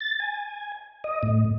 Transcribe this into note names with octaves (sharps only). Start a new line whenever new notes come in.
A6
G#5
D#5
A2